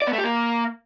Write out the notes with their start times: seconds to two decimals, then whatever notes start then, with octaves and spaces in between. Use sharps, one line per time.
0.02 D5
0.07 B3
0.13 A3
0.18 G4
0.24 A#3